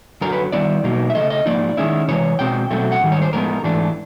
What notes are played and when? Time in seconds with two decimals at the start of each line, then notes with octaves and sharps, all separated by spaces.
0.21 F#2 D3 F#3 A#4
0.32 B4
0.52 D#3 G3 B3 E4 D5
0.84 B2 F#3 A#3 D#4
1.10 E5
1.15 C#3 E3 A3 D#5
1.30 D#5
1.46 G#2 F3 A#3 D#4 D5
1.77 D#3 G#3 C#4 E4
2.08 C3 E3 G#3 C#5
2.39 B2 G#3 C4 G5
2.70 B2 F#3 A3 C4
2.92 F#5
3.01 G#2 D#3 G3
3.12 C#5
3.22 C5
3.33 A2 F3 G#3 B3 A#4
3.64 G#2 E3 A3 D4